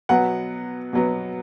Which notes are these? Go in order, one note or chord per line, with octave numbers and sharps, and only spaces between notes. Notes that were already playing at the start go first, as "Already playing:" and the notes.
B2 F#3 B3 F#5
B2 F#3 B3